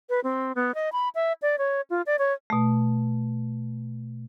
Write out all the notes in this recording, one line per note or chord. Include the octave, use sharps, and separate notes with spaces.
B4
C4
B3
D#5
B5
E5
D5
C#5
F4
D5
C#5
B2 A3